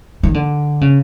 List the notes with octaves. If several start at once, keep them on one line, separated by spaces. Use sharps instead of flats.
D#3
D3
C#3